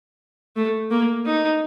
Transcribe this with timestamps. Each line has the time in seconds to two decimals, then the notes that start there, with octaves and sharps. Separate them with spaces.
0.56 A3
0.91 A#3
1.26 D#4